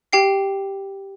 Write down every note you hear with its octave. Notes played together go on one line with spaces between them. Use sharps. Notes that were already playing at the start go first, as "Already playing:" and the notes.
G4 G5 C7